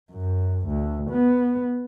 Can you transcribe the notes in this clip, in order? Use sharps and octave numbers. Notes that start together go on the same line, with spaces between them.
F#2
D2
B3